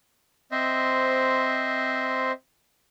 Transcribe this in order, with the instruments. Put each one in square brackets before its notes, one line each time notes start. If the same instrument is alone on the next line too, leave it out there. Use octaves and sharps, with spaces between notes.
[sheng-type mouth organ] C4 C5 D#5 E5